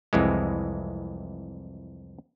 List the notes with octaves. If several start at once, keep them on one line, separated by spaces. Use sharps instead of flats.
C2 F2 E3 G#3